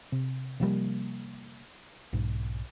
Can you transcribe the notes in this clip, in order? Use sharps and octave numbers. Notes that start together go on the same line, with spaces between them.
C3
C3 F3 G3 A#3
B1 G#2